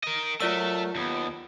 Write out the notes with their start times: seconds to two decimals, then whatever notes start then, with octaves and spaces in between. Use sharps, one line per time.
0.04 A#4 D#5
0.40 F#3 A3 F4 A#4 D5 E5 E6
0.95 D#2 B3